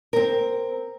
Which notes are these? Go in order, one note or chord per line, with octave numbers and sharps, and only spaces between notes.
C4 A#4